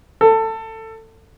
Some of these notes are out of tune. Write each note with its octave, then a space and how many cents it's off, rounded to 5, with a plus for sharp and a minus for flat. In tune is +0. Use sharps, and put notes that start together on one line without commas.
A4 +20